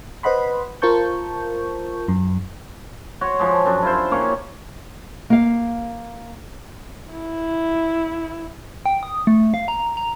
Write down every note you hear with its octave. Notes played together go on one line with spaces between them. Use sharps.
B4 C5 D#5 F#5 B5 C6
F4 A#4 C5 A5 C#6 G6
F#2
F#4 C#5 C6
F3 G#3
F#2 D4
E4 F4 C5
A#3 C#4 G4 C#5
A#3 F5
E4
G5
D#6
A3
F5
A#5
A#5